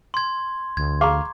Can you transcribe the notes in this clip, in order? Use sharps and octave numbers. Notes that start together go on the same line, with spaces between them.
C6 G#6
D2 G#6
F5 A#5 C#6 D6